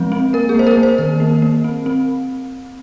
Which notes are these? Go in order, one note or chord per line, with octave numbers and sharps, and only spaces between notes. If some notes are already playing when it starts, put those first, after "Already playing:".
Already playing: F3 G#3 C4
C4
A#3 A#4
G#4
A#3 C5
A#4
A#3
C5
D#3 A#4
A#3
A#3
C4
C4